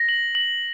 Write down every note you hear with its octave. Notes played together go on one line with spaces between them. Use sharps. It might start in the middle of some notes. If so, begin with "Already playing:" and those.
Already playing: A#6
F#7
F#7